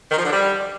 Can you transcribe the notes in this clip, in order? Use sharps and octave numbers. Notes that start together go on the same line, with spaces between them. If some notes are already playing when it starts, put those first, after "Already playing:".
D#3
F3
D3
G3